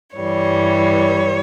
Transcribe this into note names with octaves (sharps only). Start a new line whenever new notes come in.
G2 E3 G3 C#5